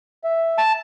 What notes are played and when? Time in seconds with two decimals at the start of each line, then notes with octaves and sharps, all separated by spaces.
0.24 E5
0.58 A5